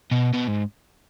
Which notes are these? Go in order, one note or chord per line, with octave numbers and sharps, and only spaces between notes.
B2
B2
G#2